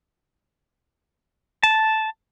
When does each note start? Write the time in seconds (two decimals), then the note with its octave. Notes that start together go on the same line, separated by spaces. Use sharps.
1.63 A5